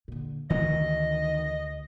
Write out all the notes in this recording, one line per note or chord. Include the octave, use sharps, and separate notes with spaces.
A#2 D3
D2 D#3 E3 C#4 D#5